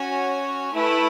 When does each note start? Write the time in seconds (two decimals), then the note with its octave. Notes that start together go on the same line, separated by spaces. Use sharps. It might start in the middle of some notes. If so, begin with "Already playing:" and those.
Already playing: C#4 F#4 C#5 G#5
0.73 A3 E4 B4